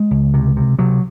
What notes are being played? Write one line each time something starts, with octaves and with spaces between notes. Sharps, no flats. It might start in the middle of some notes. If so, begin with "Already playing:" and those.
Already playing: G#3
C#2
C3
C3
C3 F#3